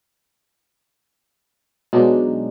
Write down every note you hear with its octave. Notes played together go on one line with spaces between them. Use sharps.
B2 F#3 G#3 D4 D#4